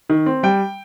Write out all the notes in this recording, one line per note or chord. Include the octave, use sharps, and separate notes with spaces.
D#3
C4
G3 G5